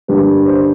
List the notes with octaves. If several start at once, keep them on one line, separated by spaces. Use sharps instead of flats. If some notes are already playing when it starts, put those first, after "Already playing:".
G2 D3 G3 A#3 B4
B4
C5